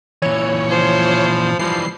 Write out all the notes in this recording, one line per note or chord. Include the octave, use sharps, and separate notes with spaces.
A#2 E3 C#5
F3 C5
E3 F3 G3 C7